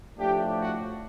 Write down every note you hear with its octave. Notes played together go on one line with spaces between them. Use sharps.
A2 F3 A3 D4 G4
F#4